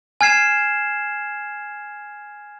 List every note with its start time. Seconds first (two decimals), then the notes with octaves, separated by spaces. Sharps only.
0.21 G#5 F6 G#6 C7 E7